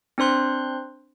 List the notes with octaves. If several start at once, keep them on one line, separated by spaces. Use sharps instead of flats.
C4 D4 C5 C6 F#6